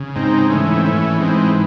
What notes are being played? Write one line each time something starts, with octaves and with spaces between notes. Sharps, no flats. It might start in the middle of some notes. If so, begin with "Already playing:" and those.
Already playing: C#3
G#2 C4 D#4
E3 A3 C#4
C4
E3 A3 C#4
G#2 G#3 C4